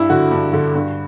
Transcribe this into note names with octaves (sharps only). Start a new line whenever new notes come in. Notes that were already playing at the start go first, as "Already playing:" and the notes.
Already playing: G2 E4
D3 F#4
G2
D3
G2